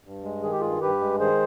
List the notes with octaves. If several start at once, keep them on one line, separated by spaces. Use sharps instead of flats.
G2
G#3
D#3 G#4
G4
G2 F4 G#4
G2 G4 B4
G#3
D#3 G#4 C5